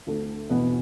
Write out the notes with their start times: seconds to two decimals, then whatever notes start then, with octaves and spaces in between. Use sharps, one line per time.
0.07 D2 D3 A4
0.50 E2 B2 B3 B4